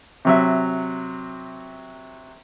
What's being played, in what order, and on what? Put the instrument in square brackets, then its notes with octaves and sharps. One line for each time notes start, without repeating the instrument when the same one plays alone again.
[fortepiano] C3 F#3 E5